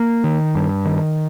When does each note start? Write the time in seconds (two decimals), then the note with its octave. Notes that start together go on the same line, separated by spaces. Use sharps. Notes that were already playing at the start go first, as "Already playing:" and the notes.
Already playing: A#3
0.24 D#3
0.55 G2
0.85 D#3